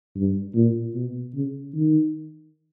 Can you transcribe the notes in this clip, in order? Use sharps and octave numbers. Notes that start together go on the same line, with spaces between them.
G2
A#2
B2
C#3
D#3